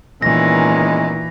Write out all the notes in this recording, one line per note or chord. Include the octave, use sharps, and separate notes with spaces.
A#2 D#3 E3 G#3 B3 C#4 A#6